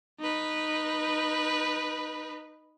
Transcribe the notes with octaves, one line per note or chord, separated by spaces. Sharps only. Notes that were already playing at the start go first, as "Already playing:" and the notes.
D#4 B4